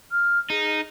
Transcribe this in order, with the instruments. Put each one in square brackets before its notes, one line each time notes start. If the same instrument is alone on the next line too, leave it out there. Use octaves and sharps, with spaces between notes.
[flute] F6
[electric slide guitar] D#4 [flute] G#4